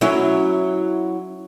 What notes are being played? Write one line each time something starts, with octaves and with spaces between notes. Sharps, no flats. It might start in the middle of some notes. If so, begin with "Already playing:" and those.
F#3 C#4 E4